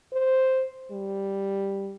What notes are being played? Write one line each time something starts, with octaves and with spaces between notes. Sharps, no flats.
C5
G3